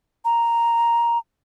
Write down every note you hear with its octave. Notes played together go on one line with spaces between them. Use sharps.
A#5